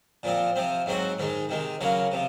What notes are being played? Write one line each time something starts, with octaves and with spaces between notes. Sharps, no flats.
A#2 F3 C4
C3 F3 C4
G#2 F#3 C4 F#4
G#2 D#3 G#3
C3 D#3 G#3
C#3 F#3 A#3 C#4
C3 F3